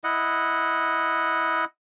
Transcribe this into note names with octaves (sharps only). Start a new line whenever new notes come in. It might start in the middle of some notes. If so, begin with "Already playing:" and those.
E4 D#5 F#5